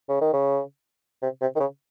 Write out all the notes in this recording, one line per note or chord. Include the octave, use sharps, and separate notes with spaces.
C#3
D#3
C#3
C3
C3
D#3
C#3